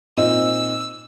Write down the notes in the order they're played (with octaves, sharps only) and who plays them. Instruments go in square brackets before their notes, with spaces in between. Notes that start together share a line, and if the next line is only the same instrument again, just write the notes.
[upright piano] A#2 C4 D#4 [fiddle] E6